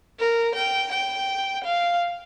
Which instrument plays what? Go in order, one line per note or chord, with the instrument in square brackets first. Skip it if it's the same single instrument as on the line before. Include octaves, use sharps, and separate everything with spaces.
[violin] A#4
G5
G5
F5